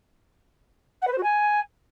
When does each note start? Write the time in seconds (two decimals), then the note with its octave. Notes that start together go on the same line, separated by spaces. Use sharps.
1.02 F#5
1.07 B4
1.13 C5
1.18 F#4
1.23 G#5